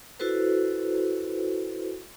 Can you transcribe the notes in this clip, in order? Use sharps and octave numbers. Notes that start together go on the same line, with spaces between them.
E4 F#4 A4 B4 C5